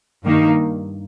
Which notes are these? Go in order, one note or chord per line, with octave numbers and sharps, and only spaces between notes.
G2 D#3 A#3 D#4